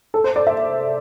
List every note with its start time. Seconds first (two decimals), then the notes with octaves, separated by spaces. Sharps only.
0.14 A4
0.24 C5
0.36 D5
0.47 E5